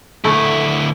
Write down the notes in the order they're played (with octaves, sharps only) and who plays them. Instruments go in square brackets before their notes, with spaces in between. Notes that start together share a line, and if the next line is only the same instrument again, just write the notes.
[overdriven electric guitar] D2 E4 [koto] A3